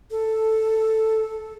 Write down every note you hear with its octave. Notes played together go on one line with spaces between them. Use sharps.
A4